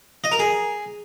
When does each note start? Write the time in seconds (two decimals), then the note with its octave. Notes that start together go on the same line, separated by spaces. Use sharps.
0.24 D#5
0.32 A#4
0.39 G#4